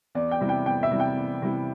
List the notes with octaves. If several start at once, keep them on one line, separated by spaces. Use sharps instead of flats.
E2 D5
G5
C3 G3 E4
G5
E2 G5
E5
C3 G3 E4
G5
E2
C3 G3 E4